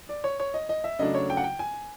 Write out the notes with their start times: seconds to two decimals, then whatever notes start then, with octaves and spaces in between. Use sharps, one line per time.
0.09 D5
0.24 C#5
0.40 C#5
0.54 D#5
0.69 D#5
0.84 E5
0.99 C#3 F#3 A3 D4 D#5
1.15 C#5
1.30 G5
1.37 F#5
1.44 G5
1.59 G#5